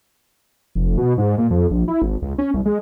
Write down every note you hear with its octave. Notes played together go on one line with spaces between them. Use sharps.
F1
B2
G#2
A#2
F2
A#1
E4
G#1
C#2
C#4
C2
G#3